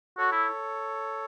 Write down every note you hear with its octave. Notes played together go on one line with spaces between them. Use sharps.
F#4 A4 C#5
E4